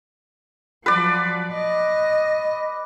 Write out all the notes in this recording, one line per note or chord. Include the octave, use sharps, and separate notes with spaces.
F3 F#3 B4 D5
D#5